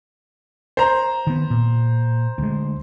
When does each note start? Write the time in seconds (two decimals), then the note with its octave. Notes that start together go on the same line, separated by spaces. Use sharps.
0.77 C5 A#5
1.27 D#3 B3
1.50 A#2
2.38 D2 G#3